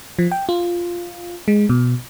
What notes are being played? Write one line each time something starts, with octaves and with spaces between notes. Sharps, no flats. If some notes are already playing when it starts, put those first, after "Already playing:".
F3
G5
F4
G#3
B2